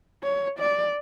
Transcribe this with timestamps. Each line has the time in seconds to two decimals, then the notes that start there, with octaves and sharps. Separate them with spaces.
0.23 C#5
0.59 D5